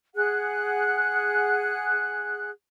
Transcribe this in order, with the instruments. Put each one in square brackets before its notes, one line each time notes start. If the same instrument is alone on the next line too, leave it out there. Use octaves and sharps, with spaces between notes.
[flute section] G#4 F#5 F#6